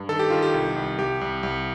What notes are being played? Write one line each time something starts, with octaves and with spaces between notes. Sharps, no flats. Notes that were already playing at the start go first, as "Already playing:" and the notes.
Already playing: G2
D#3 A4
G4
D#3 F4
G4
C2
C2
C2 G4
C2
C2